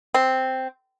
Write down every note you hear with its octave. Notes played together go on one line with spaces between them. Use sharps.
C4